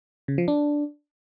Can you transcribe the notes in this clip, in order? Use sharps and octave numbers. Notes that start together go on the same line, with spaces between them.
C#3
F3
D4